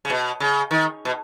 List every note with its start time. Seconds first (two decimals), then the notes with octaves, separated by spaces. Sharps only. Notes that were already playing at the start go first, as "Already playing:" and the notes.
0.05 C#3
0.10 B2
0.40 C#3
0.71 D#3
1.05 B2